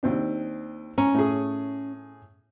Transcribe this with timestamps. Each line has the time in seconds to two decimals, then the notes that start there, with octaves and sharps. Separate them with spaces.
0.03 D#2 C4 D4
0.98 C#4 A#5
1.14 A2 G#4